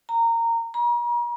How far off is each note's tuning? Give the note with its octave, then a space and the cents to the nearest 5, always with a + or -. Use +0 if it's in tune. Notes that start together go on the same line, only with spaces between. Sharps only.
A#5 -15
A#5 +40